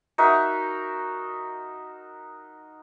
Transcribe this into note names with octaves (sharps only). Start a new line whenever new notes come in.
D#4 F#4 A#4 E5